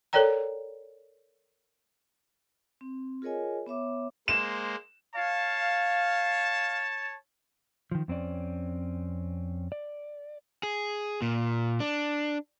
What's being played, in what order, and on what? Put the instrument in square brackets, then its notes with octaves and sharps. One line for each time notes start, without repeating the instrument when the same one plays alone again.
[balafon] A4 A#4 C#5 D5 G5 A#5
[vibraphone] C4
F4 G#4 A#4 C#5 D#5 G#5
B3 C#5 E5 D6
[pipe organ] G#3 A#3 C5 [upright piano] E7
[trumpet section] C#5 A5 [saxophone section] F5
[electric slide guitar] D#3 F3
F2 C4 C#4 D5
D5
[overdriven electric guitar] G#4
A#2
D4